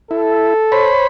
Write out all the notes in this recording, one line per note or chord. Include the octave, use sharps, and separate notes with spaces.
E4 A4
C5 C#5 B5